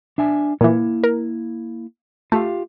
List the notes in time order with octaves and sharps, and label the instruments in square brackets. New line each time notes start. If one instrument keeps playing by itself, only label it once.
[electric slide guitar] D4 E5 G#5
[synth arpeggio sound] A#2 E3 [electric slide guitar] A#3 E4
[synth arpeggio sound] A#4
[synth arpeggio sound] A3 [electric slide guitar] F4 G4 F5